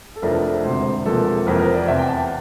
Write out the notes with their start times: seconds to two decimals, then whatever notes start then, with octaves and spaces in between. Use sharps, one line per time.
0.16 A4
0.22 F1 F2 E3 A3 D4 A#4
0.64 E1 D2 C3 C5
1.06 E1 E2 C3 F3 A#3 A4
1.46 F1 F2 E3 A#4
1.60 A#4
1.75 D5
1.88 E2 C3 E3 E5
1.99 G5
2.08 A5
2.19 G5